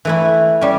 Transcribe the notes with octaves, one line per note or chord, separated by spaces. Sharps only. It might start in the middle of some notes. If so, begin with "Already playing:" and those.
E3 A3 E4
G3 C#4